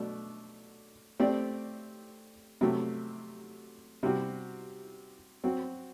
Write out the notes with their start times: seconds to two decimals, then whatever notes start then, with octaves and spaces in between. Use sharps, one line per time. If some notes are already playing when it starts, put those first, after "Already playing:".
Already playing: B2 F#3 A3 D4
1.20 A3 C4 G4 D5
2.61 C3 F#3 A3
4.03 C3 G3 C4 F#4
5.44 F#3 C4 F#4